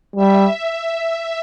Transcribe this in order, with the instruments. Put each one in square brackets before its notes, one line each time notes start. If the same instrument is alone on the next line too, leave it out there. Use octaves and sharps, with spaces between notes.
[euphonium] G3 [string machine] E5